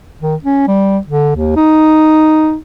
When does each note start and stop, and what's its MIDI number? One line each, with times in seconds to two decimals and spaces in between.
0.22 0.36 51
0.44 0.67 61
0.68 0.98 55
1.07 1.32 50
1.36 1.54 39
1.56 2.57 63